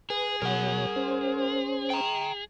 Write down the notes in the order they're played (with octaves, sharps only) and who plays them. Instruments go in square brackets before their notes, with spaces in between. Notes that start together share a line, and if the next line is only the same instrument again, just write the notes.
[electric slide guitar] G#4 [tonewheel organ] B4
[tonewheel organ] B2 F#3 C#5 [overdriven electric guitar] A#4 F#5
[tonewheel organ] C#4 C5
[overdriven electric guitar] G5 A#5